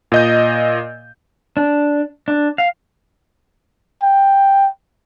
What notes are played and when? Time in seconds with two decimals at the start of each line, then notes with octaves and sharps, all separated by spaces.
0.12 A#2 D#5 G6
1.57 D4
2.28 D4
2.58 F5
4.03 G5